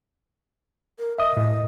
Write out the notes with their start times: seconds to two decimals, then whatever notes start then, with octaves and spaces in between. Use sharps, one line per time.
0.99 A#4
1.18 D#5 E5 D#6
1.37 A2